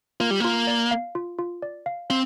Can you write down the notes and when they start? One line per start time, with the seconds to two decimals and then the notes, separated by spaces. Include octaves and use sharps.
0.20 A#3 F4
0.31 G3
0.40 A#3 F4
0.67 D5
0.91 F5
1.15 F4
1.39 F4
1.62 D5
1.86 F5
2.10 C4 F5